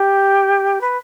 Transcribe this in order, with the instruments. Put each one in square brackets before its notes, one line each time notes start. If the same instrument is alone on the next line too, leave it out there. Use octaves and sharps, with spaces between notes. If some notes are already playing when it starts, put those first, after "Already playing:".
Already playing: [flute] G4
B4